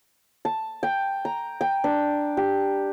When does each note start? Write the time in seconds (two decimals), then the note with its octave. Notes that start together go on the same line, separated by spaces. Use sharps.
0.45 A5
0.83 G5
1.25 A#5
1.61 G5
1.84 D4
2.37 G4